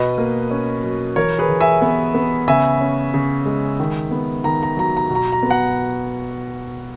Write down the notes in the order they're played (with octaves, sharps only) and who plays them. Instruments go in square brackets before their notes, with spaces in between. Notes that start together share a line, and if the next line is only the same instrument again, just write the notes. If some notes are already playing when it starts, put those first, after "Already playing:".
Already playing: [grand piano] B2 B4 D#5
A#3
C#4
F#3
E3 A#4 C#5
G#4 B4
E3
E5 G#5
B3
B3
C#3 E5 G#5
C#4
C#3
G#3
D#3
B3
D#3 A#5
A#5
F#3 A#5
A#5
B2
A#5
A#5
B3
F#5 A#5